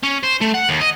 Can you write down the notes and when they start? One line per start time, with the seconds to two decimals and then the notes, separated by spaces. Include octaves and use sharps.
0.03 C#4
0.23 C5
0.41 A3
0.54 F#5
0.69 D#2
0.81 D#5